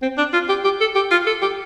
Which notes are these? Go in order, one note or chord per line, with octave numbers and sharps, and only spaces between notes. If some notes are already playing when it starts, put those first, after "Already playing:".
C4
D4
F4
G4
G4
A4
G4
F4
A4
G4